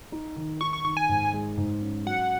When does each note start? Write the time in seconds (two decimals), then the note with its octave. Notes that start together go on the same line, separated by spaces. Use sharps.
0.12 D#4
0.36 D#3
0.61 D#4 C#6
0.73 C#6
0.85 D#3 C#6
0.97 G#5
1.09 G#2
1.33 G#3
1.58 G#2
1.82 C#4
2.06 F#3 F#5